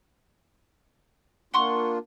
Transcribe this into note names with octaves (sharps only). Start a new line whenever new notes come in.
A#3 D4 F4 F#5 C6 C#6